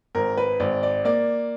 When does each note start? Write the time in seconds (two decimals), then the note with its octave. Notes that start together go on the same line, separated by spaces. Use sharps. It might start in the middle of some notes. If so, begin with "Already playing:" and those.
0.15 G#1 A#4
0.37 B4
0.60 G#1 D5
0.83 D5
1.05 A#3 D5